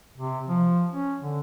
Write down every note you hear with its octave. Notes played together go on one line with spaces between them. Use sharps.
C3
F3
C#4
D3